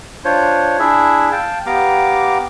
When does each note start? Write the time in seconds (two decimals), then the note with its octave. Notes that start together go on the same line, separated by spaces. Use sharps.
0.24 D4 F4 C5 C#5
0.79 D4 E4 G#4 E5
1.32 F5 G5 A5
1.66 B3 G4 F5 A#5 D6